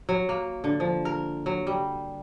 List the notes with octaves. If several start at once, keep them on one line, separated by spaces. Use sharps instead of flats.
F#3
A#3
D3
F3
A#4
F#3
G3